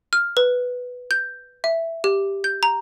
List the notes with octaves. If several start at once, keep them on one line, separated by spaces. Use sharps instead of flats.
F6
B4
G6
E5
G4
G6
A#5